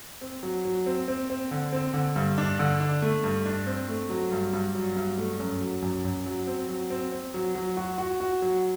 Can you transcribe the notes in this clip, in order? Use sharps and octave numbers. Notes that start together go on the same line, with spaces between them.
C4
F#3
F#3
C4
C4
C4
D3
C4
D3
G2
D4
D3
D4
A3
G2
D4
C4
A3
F#3
G2
G2
F#3
G2
A3
F#2
F#3
F#2
F#2
F#3
C4
F#3
C4
C4
F#3
F#3
F#4
F#4
F#4
F#3